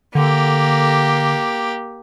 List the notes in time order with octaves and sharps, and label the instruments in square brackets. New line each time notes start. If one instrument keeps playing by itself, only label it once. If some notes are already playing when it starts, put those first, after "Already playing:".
[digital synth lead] D3 [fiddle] A#3 G4